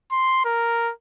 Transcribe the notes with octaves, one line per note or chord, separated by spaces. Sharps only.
C6
A#4